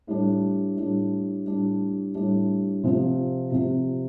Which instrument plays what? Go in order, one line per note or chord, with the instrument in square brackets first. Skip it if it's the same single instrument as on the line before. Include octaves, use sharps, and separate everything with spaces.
[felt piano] A2 G3 D4
A2 G3 D4
A2 G3 D4
A2 G3 D4
C3 F3 C4
C3 F3 C4